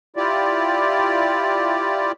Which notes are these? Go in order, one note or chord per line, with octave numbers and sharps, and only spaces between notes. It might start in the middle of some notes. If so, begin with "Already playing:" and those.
E4 F4 G4 D5